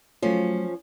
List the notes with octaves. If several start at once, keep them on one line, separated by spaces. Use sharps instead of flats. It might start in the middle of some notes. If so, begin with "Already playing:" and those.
F3 F#3 A3 C#4 F4